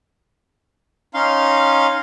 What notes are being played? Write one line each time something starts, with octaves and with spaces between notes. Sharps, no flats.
C#4 D#4 F5 C6